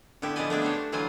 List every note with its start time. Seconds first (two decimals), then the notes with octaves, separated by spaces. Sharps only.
0.22 D3 B3 E4 G4
0.36 D3 F3 G#4 D5 D#5 G#5
0.50 A3 B3 D4 G#4
0.62 D4 G4 C5 C#5
0.73 D4
0.92 D3 E3 F#3 F4 C5 G#5